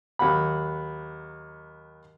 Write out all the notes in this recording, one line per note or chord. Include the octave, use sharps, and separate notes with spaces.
D#2 F#3 F#5 B5